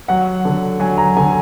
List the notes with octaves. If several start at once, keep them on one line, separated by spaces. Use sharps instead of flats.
F#3 F#5
D3
F#3 G#5
A#5
D3 G#5